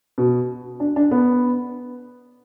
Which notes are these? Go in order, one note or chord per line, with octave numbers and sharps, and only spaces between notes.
B2
D4
D4
B3